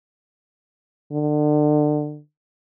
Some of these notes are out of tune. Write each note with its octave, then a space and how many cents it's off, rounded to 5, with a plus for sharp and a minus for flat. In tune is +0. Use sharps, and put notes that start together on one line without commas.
D3 +30